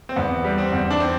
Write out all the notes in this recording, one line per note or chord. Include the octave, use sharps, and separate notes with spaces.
C4
E2 B3
G3
C4
E2
D4
C4